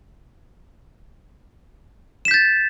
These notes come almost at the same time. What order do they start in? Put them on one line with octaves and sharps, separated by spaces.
E7 B6 G6 A6